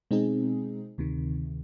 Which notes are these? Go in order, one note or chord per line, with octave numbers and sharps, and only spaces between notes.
B2 G#3 C4 D#4 G#4
D2 C3 D#3